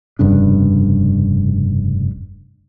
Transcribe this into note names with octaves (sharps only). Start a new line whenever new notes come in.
F1 G2 C#3 D4